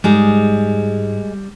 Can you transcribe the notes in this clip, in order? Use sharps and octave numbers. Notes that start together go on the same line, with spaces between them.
G#2 G3 G#3 G#4